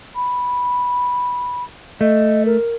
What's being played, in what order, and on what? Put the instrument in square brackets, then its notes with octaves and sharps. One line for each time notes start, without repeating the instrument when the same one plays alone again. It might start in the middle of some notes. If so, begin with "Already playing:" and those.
[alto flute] B5
[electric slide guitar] A3 [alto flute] D#5
[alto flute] A#4